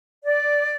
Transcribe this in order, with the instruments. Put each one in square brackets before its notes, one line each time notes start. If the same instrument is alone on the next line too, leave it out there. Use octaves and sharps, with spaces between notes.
[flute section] D5